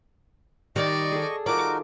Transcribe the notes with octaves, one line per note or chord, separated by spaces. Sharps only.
D#3 G3 D5 D#5 C#6
G#4 A4
D#3 D#4 F4 F#4 A#4 D5 D6